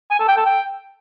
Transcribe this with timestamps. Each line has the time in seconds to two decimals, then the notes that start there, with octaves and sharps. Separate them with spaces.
0.11 G#5
0.19 A4
0.28 G5
0.37 A4
0.46 G5